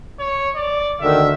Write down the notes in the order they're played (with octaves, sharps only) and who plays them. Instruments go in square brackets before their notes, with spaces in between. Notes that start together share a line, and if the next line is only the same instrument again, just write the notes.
[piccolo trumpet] C#5
D5
[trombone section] D2 D3 [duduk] D#3 [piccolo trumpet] E5